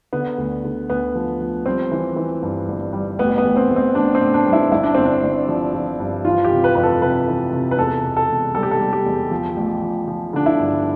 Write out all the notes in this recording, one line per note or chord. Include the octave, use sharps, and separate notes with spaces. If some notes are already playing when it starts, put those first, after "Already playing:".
D3 B3
D2
D3
D2 B3
F3
F3
G3 C4
E3
E3
G2
G1
G3
A1 B3
B3
A1
C4
A1
C4
A1 D4
C4
A2
D4
G3
E4
G1 E4
D4
G1 C4
D4
G1
F3
F3
G2
E3 F4
G4
C3
B4
F2 B4
A4
C3 B4
E3
C3
B4
E2 A4
B2
A4
E1
G3 A4
G4
A4
G3
G4
E2
F3
A1
F3
F3
D3 D4
E4
G2